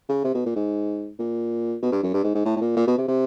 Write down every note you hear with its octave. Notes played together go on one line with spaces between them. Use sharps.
C#3
C3
B2
A#2
G#2
A#2
B2
G2
F#2
G2
G#2
G#2
A2
A2
A#2
A#2
B2
C3
C3